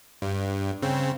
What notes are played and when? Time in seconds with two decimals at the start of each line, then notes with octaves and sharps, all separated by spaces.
0.22 G2
0.82 C#3 C4